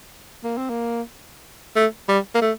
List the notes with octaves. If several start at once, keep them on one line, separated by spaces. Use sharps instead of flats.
A#3
C4
A#3
A3
G3
A#3
A3